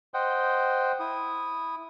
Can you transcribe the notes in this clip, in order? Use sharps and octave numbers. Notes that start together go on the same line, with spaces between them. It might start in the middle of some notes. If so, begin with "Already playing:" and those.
C5 D#5 F#5 G5
E4 D#6